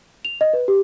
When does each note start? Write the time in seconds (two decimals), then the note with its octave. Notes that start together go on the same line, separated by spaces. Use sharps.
0.25 F7
0.41 D#5
0.53 B4
0.68 G4